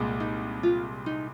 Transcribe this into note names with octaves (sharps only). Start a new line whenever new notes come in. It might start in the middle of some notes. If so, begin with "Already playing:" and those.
Already playing: C2 A#2 G#3
D#4
F4
D#4